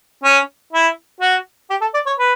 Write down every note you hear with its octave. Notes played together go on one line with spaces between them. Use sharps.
C#4
E4
F#4
G4
A4
D5
C#5
B4